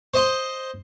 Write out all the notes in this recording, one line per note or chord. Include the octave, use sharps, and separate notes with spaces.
C5 D#5 C6